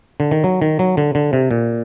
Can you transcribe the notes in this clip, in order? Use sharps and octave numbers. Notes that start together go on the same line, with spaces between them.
D3
D#3
F#3
D#3
F#3
D3
D3
C3
A#2